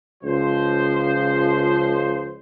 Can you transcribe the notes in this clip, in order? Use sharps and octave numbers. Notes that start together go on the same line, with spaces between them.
C#2 F3 C5